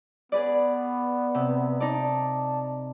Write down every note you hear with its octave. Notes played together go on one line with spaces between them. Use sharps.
B3 G#4 B4 D5
C3
D#4 D5 A5